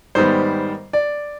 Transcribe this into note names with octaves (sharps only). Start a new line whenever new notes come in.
G#2 D#3 G3 B3 C5
D5